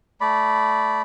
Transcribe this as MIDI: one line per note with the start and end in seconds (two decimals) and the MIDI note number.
0.21 1.02 57
0.21 1.02 74
0.21 1.02 83